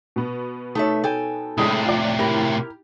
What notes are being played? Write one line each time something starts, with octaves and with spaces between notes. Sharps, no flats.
B2 B3
A3 D#4 A4 C#5 E5
A4 G5 G#5
A2 C3 G#3 D4 E4 D#6
F4 D5
E4 G4 A#4